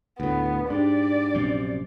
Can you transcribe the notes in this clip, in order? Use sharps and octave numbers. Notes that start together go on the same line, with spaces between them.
D2 A2 B3
G#2 D4 G4 D5
A#1 F#2 C3